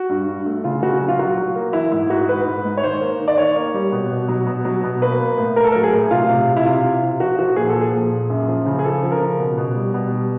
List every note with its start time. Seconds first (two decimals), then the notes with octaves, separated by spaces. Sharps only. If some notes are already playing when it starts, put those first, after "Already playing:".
Already playing: F#4
0.10 G2
0.28 G2
0.46 A3
0.64 C#3 F4
0.82 C#3 F#4
1.01 F#3
1.08 F4
1.19 F#3 F#4
1.37 F#3
1.56 A#3
1.73 E3 E4
1.92 G#2 E4
2.10 G#2 F#4
2.28 G#2 B4
2.47 G#2
2.65 G#2
2.78 C#5
2.83 D#3 C5
3.01 A#3
3.19 D#3
3.28 D5
3.38 D#3 C#5
3.56 A#3
3.74 G3
3.92 B2
4.11 B2
4.28 F#3
4.46 B2
4.65 F#3
4.84 B2
5.02 A#3 B4
5.20 A#3
5.38 A2
5.56 A#3 A#4
5.64 A4
5.72 F#3 A#4
5.83 G#4
5.93 A2
6.11 C3 F4
6.29 C3
6.47 C3
6.57 E4
6.65 C3 F4
6.84 C3
7.02 C3
7.20 F3 F#4
7.38 F3 F#4
7.56 A#2 G#4
7.69 A4
7.75 F3
7.81 G#4
7.93 A#2
8.11 A#2
8.30 F#2
8.48 F3
8.66 C#3
8.79 G#4
8.84 F3 A4
9.03 F3
9.12 A#4
9.21 C#3
9.39 B2
9.57 B2
9.76 G3
9.94 B2
10.12 G3